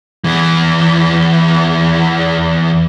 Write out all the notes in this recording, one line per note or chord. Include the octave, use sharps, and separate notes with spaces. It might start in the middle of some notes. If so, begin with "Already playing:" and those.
E2 E3